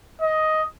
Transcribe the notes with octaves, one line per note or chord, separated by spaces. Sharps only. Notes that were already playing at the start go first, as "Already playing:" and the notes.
D#5